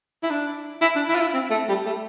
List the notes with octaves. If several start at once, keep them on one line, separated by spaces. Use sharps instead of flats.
E4
D4
E4
D4
E4
F4
E4
C4
A3
G3
A3